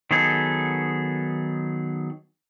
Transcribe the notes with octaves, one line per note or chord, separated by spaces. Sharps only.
D#3 F#3 B3 D#4 G#4 A4